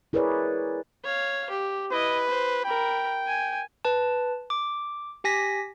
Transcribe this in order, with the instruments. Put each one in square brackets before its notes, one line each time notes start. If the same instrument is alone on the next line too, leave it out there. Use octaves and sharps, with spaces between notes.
[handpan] E4 G#4 A#4 B4 C#5 D5
[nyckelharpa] C#5 F5
G4
[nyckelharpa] E4 D#5 [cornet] B4
[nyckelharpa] C5
[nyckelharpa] A#4 B5 [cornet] G5
[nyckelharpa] G#5
[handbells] B4 A5
D6
G4 G#5 A#6 B6